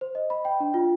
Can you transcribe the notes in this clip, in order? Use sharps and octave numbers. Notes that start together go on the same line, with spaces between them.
C5
D#5
B5
G5
D4
F4